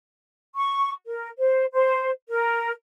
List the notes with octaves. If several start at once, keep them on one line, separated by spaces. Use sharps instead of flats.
C#6
A#4
C5
C5
A#4